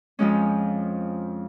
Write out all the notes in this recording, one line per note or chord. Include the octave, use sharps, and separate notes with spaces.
F2 F3 G#3 C#4